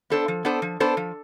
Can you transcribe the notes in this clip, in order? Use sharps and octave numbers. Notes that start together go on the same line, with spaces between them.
B3 D4 A4 C5
F3
B3 D4 A4 C5
F3
B3 D4 A4 C5
F3